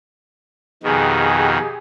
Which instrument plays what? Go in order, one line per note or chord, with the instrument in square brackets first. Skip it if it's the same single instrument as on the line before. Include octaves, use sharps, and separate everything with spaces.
[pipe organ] F2 B2 D#3 [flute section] G4 G#4